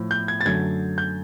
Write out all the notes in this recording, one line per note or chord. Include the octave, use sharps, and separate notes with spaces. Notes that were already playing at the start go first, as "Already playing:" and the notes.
Already playing: A2 F3
G6
G#6
A6
F#2 D3 F#3 A3 G#6
G6